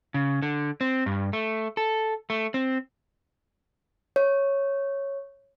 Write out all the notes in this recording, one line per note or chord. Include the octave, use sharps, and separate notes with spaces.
C#3
D3
C4
G2
A3
A4
A3
C4
C#5